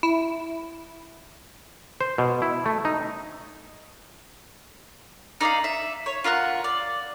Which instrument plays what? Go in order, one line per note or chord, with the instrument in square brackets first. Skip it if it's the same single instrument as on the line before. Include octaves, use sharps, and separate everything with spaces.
[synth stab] E4
[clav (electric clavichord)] C5
B2
E4
A3
D#4
[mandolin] D#4 D5 E5 F5
E5
C#5
F4 A#4 E5 F#5
D5